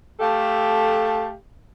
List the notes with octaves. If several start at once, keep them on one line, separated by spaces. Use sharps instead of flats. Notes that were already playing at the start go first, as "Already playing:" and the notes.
A3 G4 A4 F5